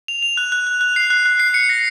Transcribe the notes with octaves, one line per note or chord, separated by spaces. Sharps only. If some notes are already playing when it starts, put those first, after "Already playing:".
F7
F7
F#6
F#6
F#6
F#6
C7
F#6
F#6
C7
C#7
A#6